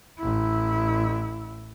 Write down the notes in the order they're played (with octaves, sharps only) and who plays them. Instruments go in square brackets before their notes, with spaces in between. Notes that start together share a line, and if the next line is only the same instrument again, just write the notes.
[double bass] A1 E4